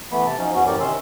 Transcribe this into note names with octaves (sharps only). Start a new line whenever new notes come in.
E3 A3 B3 B5
C3 A5
F3 F#3 C#4 D#4
E2 B3 C#4 F#4
F#2 A2 E3 G4 A#4 D5
C3 D#3 C#4 C6 E6